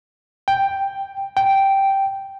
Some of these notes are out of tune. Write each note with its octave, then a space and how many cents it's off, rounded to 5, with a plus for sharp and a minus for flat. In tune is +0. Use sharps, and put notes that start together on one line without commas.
G5 +5
G5 -5